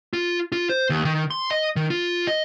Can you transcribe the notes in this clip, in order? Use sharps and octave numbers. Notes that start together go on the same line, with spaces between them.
F4
F4
C5
D#2
D#3
C6
D#5
D#3
F4
D#5